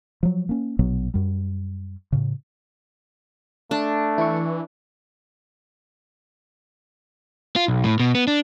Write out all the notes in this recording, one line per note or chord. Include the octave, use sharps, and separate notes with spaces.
F3 F#3
A#3 C#4
A#1 B2 F#3 B3
F#2 G3
A2 C#3
A3 D4
E3 E4 C#6
F4
B1
A2
B2
B3
D4